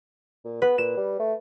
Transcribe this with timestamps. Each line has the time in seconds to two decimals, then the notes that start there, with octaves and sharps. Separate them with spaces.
0.45 A#2
0.62 B3 B4
0.78 A#2 E7
0.97 G3
1.19 A3